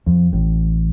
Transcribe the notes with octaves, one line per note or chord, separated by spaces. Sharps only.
F2
A1